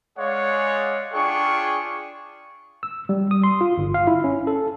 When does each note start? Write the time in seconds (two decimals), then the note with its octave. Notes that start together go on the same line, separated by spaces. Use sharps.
0.17 G#3 G#4 C#5 D5 F5 F#5
1.13 D4 F4 G#4 G5 C#6
2.83 E6
3.09 G3
3.31 D#6
3.44 C6
3.61 F4
3.78 G1
3.94 F5
4.07 E4
4.24 C#4
4.47 A4